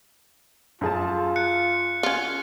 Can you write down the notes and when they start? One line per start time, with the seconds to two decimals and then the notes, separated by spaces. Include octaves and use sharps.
0.81 F#2 F4 G#4 A5
1.36 F#6 C#7
2.03 C#4 F4